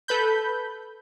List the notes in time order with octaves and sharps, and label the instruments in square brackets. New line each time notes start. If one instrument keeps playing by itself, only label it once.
[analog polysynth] A4 B4 B5 G6